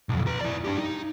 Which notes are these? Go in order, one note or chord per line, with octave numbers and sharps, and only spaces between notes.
B1 F2
B4 A#5
E4 D5
D4 G4
D#4